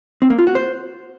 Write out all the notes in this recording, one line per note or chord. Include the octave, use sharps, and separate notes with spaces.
C4
A#3
F4
F#4
C5